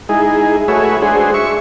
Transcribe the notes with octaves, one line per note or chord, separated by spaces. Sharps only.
G#3 D#4 E4 G#4
A3 F#4 G#4 B4 C#5 E5
G#3 D4 F#4 G#4 C5
E5 C#6